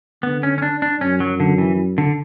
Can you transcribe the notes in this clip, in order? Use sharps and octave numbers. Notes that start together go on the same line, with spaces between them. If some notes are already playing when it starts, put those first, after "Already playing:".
D3 B3
C#4
C#4
D4
D4
F#2 C#4
F#3
D3
E3
D3